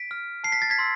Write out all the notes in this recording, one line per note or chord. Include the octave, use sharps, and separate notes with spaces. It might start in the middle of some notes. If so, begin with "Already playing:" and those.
Already playing: B6 D7
F6
A5 C7
B6
A6
G#6 B6
C6 E6